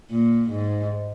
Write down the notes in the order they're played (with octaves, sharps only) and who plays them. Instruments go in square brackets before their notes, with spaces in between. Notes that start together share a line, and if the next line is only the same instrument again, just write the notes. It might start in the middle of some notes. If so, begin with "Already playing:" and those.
[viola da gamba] A#2
G#2